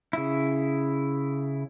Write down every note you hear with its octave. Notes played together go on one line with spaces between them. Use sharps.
C#3 E4